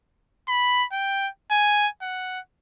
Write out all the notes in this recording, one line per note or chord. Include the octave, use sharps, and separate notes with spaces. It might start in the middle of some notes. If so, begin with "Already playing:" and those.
B5
G5
G#5
F#5